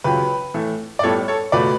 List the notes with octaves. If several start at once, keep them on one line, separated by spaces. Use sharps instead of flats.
C#2 C#3 F#3 G4 B4
A2 E3 A3
D5
A2 G3 B3 A4 C#5
A4 C#5
C#2 B2 A3 B4 D5